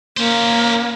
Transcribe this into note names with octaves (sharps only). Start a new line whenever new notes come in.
A#3 C#4 C5